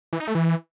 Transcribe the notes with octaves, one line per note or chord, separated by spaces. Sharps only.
E3
D#4
A3
E3